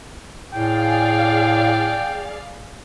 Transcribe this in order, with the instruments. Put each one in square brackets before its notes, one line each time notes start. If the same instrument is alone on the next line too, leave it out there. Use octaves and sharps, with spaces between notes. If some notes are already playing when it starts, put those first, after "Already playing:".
[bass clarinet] A2 [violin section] G#4 D5 F5 [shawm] G5